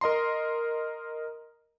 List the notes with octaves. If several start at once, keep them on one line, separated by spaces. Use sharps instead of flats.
A#4 D#5 A#5 C6